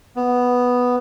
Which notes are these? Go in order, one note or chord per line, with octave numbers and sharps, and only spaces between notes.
B3